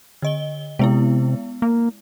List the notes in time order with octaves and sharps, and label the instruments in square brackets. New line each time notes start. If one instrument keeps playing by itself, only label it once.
[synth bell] D3 D#5 G7
[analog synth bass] C3 [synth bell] G#3 B3 E4
[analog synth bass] A#3